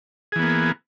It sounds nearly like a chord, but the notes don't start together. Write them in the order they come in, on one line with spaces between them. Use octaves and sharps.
G#4 E3 B3 A#3